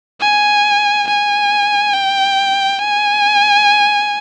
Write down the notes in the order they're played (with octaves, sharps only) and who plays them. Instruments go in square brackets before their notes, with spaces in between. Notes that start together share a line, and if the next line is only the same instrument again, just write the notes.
[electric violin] G#5
G#5
G5
G#5